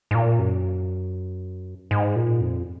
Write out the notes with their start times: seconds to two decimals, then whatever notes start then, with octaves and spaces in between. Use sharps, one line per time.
0.11 G#2
0.15 A#2
0.39 F#2
1.91 G#2
2.16 A#2
2.41 F2